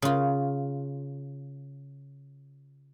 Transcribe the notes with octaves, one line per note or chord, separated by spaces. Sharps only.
C#3 F4